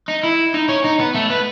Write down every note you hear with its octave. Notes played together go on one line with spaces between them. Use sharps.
D#4
E4
D#4
C#4
D#4
B3
A3
B3